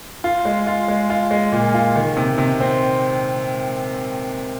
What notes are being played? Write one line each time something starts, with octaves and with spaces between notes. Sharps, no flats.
F4
G#3
F4
G#3
F4
G#3
A#2
F4
D#3
C3
C3
C4